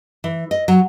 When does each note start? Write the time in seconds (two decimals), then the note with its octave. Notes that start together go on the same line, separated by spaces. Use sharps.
0.24 E3
0.51 D#5
0.68 F#3